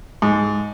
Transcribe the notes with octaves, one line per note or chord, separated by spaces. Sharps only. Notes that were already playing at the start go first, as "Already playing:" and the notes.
G#2